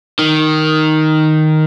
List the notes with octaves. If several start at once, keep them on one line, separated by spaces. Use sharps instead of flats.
D#3